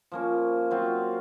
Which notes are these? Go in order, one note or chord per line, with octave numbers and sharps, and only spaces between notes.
F3 A#3 C#4
F#3 C4 F4